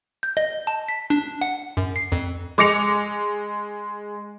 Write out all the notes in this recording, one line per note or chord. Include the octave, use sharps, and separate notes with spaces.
G6
D#5
A5
B6
D4
F#5
F#2
C7
F2
G#3 D6 A#6 C#7 F7